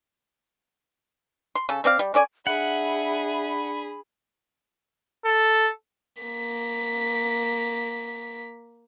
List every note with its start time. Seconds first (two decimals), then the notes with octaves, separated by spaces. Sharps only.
1.55 C6
1.69 C#3 A4
1.84 A3 C4 D5 F5
1.99 G3
2.14 C#4 A4 D5 G#5
2.47 D4 G#4 E5 F#5 B5
5.25 A4
6.22 A#3 B6